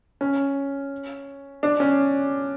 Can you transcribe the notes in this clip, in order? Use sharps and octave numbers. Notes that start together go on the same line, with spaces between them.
C#4
D4
C#4